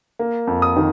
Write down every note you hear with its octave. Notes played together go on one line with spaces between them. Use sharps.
A#3
F2
D#6
D#3